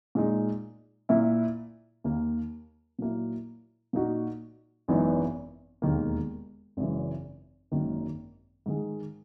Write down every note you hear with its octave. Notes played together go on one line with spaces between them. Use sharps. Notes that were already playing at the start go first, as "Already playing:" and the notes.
A#2 G#3 D#4
A#2 A#3 E4
D#2 D#3 A#3
A#2 F#3 A#3 E4
A#2 A#3 D#4 F#4
G#1 F#2 E3 B3 D#4
E1 D#2 D#3 A#3
G#1 F#2 C#3 E3
G#1 F#2 D#3 F#3 A#3
G#2 D#3 G#3